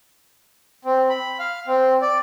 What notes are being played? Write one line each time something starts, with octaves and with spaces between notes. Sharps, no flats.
C4
B5
F5
C4
D5